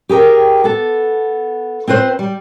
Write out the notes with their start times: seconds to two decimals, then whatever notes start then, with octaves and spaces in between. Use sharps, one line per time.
0.09 G4 G#4 A#4 G5
0.64 B3 A4
1.88 C4 F4 B4 C5
2.19 G3